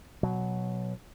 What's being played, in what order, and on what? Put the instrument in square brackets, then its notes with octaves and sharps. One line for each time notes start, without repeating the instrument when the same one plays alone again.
[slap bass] B2 F#3